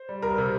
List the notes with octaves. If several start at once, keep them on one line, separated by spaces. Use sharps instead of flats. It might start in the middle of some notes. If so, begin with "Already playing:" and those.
Already playing: C5
G3
C2 A#4
C3